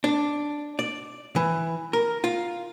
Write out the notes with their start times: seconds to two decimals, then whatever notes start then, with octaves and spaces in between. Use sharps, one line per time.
0.04 D4
0.79 D5
1.36 E3
1.93 A#4
2.24 F4